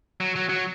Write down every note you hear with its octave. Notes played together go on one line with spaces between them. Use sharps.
F#3
F#3
F#3